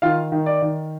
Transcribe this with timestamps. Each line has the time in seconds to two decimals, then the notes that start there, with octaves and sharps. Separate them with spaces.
0.02 D#3 F4 F5
0.32 D#3
0.46 D5
0.62 D#3